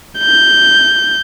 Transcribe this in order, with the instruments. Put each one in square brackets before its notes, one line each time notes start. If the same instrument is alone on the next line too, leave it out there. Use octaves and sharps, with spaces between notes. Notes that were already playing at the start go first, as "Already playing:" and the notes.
[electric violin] G6